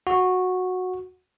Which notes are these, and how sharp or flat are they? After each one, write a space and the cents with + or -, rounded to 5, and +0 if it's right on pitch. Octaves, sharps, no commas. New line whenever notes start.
F#4 -10